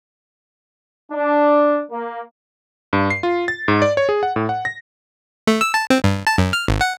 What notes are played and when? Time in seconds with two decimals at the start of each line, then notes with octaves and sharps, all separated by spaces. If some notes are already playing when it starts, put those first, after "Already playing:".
1.12 D4
1.90 A#3
2.93 G2
3.10 C7
3.23 F4
3.48 A6
3.68 G#2
3.82 D5
3.97 C#5
4.09 G#4
4.23 F#5
4.36 A2
4.49 F#5
4.65 A#6
5.47 A3
5.61 E6
5.74 A5
5.90 C4
6.04 G2
6.27 A5
6.38 F#2
6.53 F6
6.68 G#1
6.81 F#5